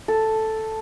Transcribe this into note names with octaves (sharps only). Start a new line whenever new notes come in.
A4